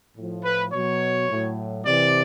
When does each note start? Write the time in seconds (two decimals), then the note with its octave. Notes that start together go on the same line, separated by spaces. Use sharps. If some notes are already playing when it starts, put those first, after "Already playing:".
0.16 A2 F3
0.44 B4
0.72 B2 F#3 C#5
1.29 A2 F#3
1.86 C3 E3 D5